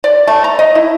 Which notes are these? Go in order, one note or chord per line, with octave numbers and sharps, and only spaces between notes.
D5
A3
A#5
D#5
E4